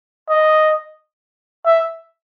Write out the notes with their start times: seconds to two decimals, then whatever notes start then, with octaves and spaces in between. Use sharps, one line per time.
0.29 D#5
1.65 E5